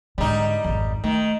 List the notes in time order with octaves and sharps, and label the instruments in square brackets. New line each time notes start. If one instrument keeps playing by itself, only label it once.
[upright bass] G#2 D3 [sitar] G3 D#4
[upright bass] G#1 F2
[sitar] D#3 [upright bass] A3